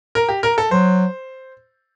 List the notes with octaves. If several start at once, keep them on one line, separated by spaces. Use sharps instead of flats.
A#4
G4
A#4
A4
F#3 C5